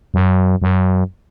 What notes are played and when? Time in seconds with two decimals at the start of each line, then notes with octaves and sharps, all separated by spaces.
0.14 F#2
0.62 F#2